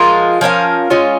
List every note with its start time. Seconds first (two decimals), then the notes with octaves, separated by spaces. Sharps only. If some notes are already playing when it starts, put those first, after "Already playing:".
Already playing: F3 G#3 F4 A#4
0.41 F3 C#4 A#4 F5
0.90 G#3 C#4 F4